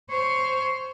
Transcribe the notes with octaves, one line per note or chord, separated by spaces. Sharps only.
C5 C#5